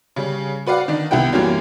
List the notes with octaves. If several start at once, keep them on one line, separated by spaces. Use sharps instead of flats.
C#3 G3
F#4 B4 D5 F5 F#5
D#3 D4
C2 D#3 B3 E4 F#5 G5
F#2 E3 G3 A#3 C#4 F4